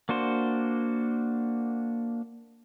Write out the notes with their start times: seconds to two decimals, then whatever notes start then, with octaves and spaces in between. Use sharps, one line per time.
0.09 A#3 D4 F#4 C5